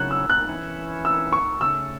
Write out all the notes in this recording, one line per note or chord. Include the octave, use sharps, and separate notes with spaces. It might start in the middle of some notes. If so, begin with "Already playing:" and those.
Already playing: C#3 F#3 C#4 E4 F#6
E6
F#6
E3 C#4 E4
E6
C#6
C#3 A3 C#4 E6